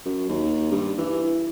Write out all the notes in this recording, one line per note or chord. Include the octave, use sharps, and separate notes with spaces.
F#2
D#2
G2
E3